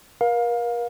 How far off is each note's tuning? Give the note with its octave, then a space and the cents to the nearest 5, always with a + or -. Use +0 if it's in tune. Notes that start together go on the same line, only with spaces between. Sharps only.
A#4 +35 F5 +20